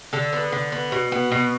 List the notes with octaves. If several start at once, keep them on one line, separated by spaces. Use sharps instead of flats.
D3 A4
B3
D3
B3
B2
B3
B2